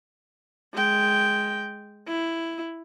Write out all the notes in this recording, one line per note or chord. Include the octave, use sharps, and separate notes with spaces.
G#3 G5
E4